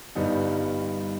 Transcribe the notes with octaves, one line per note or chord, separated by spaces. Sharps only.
G1 G2 G3 B3 D#4